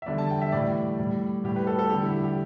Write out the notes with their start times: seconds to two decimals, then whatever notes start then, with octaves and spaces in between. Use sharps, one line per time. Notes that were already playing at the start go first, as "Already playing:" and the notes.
0.02 E5
0.06 E2 D3 G3 D5
0.18 A5
0.30 G5
0.41 E5
0.52 A2 E3 G3 D5
0.99 A2 G3
1.44 A2 G3 G4
1.56 B4
1.67 A4
1.79 A4
1.90 E2 D3 G3 G4
2.02 E4
2.13 G4
2.24 G4